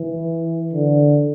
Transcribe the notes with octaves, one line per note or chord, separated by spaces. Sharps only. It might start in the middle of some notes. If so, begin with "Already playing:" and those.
Already playing: E3
D3